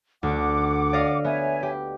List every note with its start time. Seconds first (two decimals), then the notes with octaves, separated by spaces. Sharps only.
0.23 D2 F#5 D6
0.93 D5 D#5 F5
1.24 B3 C#5 E5 G#5
1.63 G4